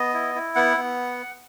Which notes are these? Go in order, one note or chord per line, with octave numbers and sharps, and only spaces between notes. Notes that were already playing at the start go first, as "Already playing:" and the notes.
Already playing: B3 D#5
E4
E4
B3 F#5
B3